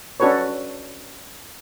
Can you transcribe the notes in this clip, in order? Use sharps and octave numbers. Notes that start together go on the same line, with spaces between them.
C#4 D4 F#4 A4 B4 C#5